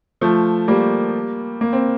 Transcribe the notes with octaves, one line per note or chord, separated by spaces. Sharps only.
F3 A3
G3 A#3
A#3
C4